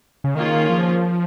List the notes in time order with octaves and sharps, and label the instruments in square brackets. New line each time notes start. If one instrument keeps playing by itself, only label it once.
[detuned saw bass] C#3
[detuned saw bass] D#3 [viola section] A#3 C#4 F4 G#4
[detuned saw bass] F3